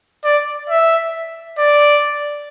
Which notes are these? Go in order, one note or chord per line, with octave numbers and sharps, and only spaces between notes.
D5
E5
D5